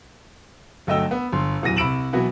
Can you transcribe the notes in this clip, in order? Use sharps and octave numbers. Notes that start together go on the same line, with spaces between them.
G1 F#3 A3 D#5 G5 E6
B3
G1 C6
D#1 E2 F#3 A#6 D#7
C2 B5 E6 D7 E7 F#7
B2 E3 F#3 B3 E4 F#4